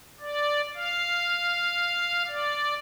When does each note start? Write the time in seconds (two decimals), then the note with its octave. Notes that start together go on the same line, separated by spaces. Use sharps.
0.21 D5
0.74 F5
2.27 D5